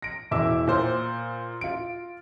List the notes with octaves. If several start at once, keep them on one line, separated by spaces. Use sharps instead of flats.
A#6 D7
E1 E3 E5 D6 E6
A#2 C5
F4 D7